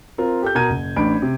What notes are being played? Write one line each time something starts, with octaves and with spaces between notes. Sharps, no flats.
C4 F4 A#4
G4 A4 G6
B2 A#4 A#5 G#6 D#7
F#1
A1 D4 B5 D7
C3